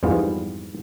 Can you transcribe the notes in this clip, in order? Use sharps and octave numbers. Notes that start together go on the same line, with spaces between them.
F2 G#2 E3 G3 B3 F4